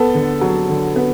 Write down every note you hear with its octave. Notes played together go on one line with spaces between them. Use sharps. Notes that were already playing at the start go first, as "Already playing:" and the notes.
Already playing: B3 A4
D3
F#3
D3
B3